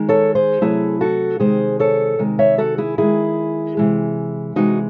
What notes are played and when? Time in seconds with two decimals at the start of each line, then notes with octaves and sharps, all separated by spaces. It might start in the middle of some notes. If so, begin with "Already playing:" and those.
Already playing: D#3 G#3
0.09 A4 C#5
0.35 G#4 C5
0.61 C3 F#3 A3 E4 G#4
1.01 F#4 A4
1.40 C3 D#3 G#3 G#4 C5
1.79 A4 C#5
2.19 C3 D#3 G#3
2.39 C#5 E5
2.58 F#4 A4
2.78 E4 G#4
2.98 D#3 G#3 E4 G#4
3.77 C3 E3 G#3
4.56 C3 E3 G#3 D#4 F#4